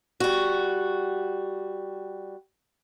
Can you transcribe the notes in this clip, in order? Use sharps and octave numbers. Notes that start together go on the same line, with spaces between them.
G3 F#4